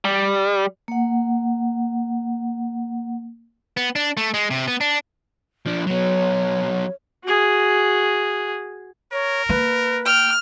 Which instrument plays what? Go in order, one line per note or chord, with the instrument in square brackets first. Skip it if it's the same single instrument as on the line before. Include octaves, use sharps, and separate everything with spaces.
[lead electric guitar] G3
[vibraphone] A#3 F#5
[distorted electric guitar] B3
D4
A3
G#3
C3
B3
D4
F3 D4
[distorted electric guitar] F#3 B3 [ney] C#5
[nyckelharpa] F#4 G#4
[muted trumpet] A#4 [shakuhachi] C#5
[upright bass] A#3 [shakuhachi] B4
[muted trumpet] G5 [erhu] F6